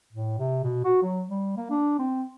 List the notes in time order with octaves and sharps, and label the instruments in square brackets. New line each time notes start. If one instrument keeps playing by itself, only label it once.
[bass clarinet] A2
C3
B2
F#4
F#3
G3
A#3
D4
C4